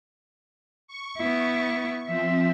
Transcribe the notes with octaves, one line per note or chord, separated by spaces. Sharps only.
C#6
B3 E4
F3 C4 E5